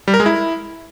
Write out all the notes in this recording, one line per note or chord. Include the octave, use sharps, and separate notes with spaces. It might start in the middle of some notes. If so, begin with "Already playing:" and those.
G3
A#4
G#3
E4